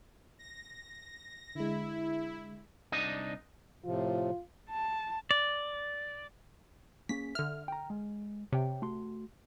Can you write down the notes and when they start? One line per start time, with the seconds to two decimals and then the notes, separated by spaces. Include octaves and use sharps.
0.39 A#6
1.55 D3 G#3 E4
2.92 C2 D4 D#4 D#5
3.85 A2 C3 F3 F4
4.70 A5
5.31 D5
7.09 A#3 C#4 G#4 B6
7.35 D3 E5 F6
7.68 G5 A#5
7.90 G#3
8.52 C3 C#5 G5
8.82 A3 F#4 C6